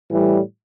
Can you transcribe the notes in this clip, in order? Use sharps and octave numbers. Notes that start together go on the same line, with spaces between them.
A2 E3 G3